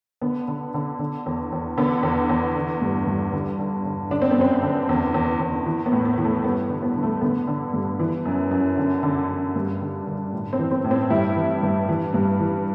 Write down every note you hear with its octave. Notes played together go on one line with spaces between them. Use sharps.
D3 B3
D3
D3
D3
E2
E2
D3 B3
E2
E2
D3
G2
G2
D3
D3
D3
D3 D4
C4
B3
F#2 C4
D3
E2
E2
E2
E3
B3
A2
B3
E3
A3
G2 B3
D3
B3
D3
A3
D3 B3
D3
G2
E3
F#2
F#2
D3
D3
D3
G2
D3
D3
A2
C4
E3
C4
A2
C4
G2 E4
E3
G2
E3
G2
E3